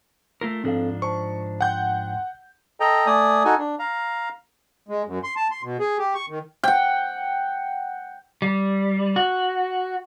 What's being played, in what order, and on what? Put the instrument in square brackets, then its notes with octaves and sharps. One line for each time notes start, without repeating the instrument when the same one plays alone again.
[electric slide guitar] A3 F4 A#4
[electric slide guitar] G#2 F3 D4 [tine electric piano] C4 A4 F5
[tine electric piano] C5 A5 [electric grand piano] C#6
[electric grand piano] F#5 G6 [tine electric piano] G5 C6
[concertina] A4 D#5 G5 A#5
A3 D5 G#5 D#6
D#4 F#4 A4 G#5
D4
F5 A#5
[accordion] G#3
F#2
C6
A5
C6
B2
G#4
G4
C#6
D#3
[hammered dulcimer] F#5 G5
[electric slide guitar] G3
F#4